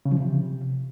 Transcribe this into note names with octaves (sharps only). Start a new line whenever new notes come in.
C#3
F3
C3